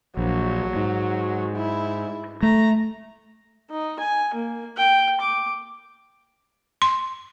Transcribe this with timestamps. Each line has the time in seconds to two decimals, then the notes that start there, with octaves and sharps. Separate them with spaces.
0.17 A#1 F#3
0.76 G#2
1.56 E4
2.43 A3 A#5
3.70 D#4
4.00 G#5
4.34 A#3
4.77 G5
5.20 D6
6.82 C6